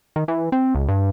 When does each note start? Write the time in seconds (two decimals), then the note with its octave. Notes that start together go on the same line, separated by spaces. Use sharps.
0.16 D#3
0.28 E3
0.52 C4
0.75 C#2
0.88 G2